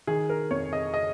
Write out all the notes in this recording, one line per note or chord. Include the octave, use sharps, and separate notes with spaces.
D#3 G#4
A#4
F2 C#5
D#5
D#5